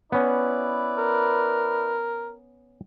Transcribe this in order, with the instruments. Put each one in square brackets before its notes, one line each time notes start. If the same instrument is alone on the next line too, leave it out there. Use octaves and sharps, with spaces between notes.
[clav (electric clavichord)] B3 C#4 [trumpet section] E4 B4 D5
[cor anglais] A#4